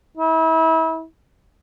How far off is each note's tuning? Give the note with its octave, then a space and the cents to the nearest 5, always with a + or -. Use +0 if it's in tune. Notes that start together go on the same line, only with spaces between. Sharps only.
E4 -35